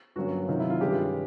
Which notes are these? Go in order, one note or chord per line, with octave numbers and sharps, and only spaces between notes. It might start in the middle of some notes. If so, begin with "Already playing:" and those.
G2 D3 F#3 A#3 C#4 F#4
C3 D#3 F#3 F4
E4
F4
G2 D#3 G#3 C#4 G4